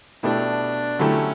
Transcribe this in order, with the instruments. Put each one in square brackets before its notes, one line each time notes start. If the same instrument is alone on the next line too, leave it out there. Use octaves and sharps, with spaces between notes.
[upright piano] B2 A3 E4 G4 [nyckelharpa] D4
[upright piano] D3 F#3 A3 E4 G4 [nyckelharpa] C#4